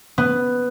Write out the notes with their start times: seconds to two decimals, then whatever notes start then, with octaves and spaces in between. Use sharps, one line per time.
0.18 B3